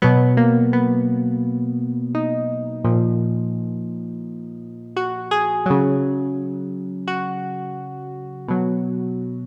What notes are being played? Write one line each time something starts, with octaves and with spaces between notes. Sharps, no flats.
B2 F#3 B3
A#3
B3
D#4
A#2 F3
F#4
G#4
C#3 F#3
F#4
B2 F#3